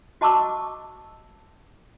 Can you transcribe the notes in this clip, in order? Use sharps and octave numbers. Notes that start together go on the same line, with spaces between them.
F#4 D#5 A5 C#6 D6 E6